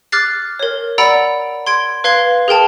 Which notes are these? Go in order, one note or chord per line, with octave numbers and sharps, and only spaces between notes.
D6 F6 F#6 A6 C7
A#4 C#5
D5 F#5 A#5 B5 E6 D7
C6 G#6 D7
B4 F5 C6 G#6 C7 G7
G#4 A#4 G5 A5